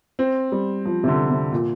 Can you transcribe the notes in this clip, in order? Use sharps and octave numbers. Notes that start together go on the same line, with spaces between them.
C4
G3
F3
C3
D3
C3
A#2